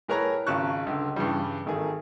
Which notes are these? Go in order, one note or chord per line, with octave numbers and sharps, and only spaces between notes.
A2 G#4 A#4 B4 C#5 A#5
G#1 C#3 F4 A5 C#6 F#6
C#2 D3
G2 C#3 E3 G3
G#1 D#3 A3 G#4